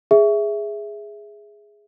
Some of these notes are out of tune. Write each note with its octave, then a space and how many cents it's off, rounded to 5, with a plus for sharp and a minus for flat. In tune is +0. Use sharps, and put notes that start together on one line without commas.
G#4 +0 E5 +0